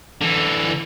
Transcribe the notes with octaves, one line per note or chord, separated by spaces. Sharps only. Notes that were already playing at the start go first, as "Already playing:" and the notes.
D3 E3